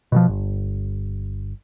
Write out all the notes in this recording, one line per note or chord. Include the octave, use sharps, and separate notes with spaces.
B2 D#3 F3
G1